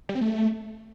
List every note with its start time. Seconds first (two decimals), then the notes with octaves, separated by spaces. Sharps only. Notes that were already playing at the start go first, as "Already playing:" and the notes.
0.09 G3
0.15 C4
0.21 A3